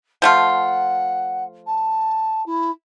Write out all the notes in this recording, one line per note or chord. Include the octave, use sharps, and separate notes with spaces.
F3 A3 F4 F#5
A5
E4